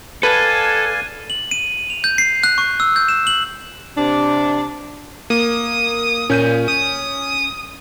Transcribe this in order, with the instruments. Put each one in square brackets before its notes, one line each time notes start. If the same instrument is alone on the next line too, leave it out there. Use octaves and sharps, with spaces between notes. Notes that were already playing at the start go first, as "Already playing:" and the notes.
[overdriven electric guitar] A4 [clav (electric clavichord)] B4 [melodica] D5 F5 G#5 [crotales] F#6 G#6 D#7
[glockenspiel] F#7
D#7
F7
G6
C7
F#6
C#6
E6
G6
E7
F#7
[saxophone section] C3 D4
[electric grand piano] A#3 [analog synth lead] D#6
[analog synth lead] A#2 [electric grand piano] C#4 G6 D#7
[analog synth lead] D#6